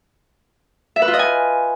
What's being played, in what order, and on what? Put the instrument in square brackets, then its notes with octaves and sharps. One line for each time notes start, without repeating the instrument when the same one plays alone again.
[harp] E5
B4
F4
D#5
G#5